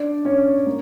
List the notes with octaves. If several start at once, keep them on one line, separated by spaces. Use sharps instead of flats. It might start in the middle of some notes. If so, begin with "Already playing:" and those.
Already playing: D4 D5
C#4 C#5
A#3